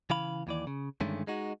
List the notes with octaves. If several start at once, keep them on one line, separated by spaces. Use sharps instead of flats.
C#3 E3 F5 B5
D#2 E3 D5
C#3
G2 D3 D#3 G#3 A3 C#4
G#3 D#4 F#4